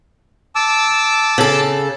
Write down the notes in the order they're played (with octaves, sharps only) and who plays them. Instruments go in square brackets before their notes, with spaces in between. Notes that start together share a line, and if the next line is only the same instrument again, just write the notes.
[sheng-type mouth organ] A5 D6 E6
[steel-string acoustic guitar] C#3 A4